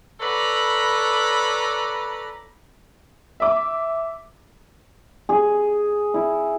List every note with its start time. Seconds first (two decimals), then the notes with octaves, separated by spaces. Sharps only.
0.20 A4 B4 C#5 D5 A#5 B5
3.40 E5 D6
5.29 G#4
6.14 E4